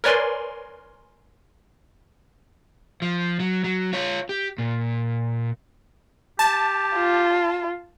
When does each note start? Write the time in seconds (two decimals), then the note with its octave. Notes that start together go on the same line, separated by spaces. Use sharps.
0.04 A#4 B4 C#5 D5 G#5 C6
3.02 F3
3.40 F#3
3.64 F#3
3.93 F4 C#5
4.29 G4
4.58 A#2
6.39 G4 A5
6.96 F4